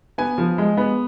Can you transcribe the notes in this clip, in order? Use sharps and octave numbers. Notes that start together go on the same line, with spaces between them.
B3 G#5
F3
G#3
B3